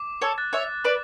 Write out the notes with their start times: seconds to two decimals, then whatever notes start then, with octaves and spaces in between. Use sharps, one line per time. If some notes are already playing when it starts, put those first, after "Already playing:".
Already playing: D6
0.22 A4 C#5
0.38 F#6 A6
0.53 C#5 E5
0.84 B4 D5 D6